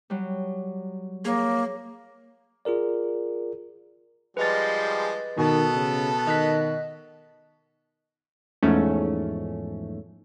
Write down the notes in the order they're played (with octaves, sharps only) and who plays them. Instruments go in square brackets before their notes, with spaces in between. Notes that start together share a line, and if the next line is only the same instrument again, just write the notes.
[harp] F#3 G3
[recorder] A#3 [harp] G#4 C#5
[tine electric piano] F4 G#4 A#4 D5
[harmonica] F3 G3 G#3 [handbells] B4 D#5 A6
[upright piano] B2 [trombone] D#3 [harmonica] B3 A4 A5
[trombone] C#3
[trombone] D#3 [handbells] D#5 F#6 B6
[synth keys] E2 G#2 F3 A3 C#4